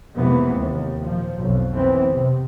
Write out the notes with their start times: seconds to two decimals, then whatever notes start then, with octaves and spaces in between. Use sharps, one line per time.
0.16 F2 C3 E3 G#3 A#3 B3
0.56 D#2
1.01 A#2 F3
1.35 B1 F2
1.73 E3 B3 C4
2.12 C3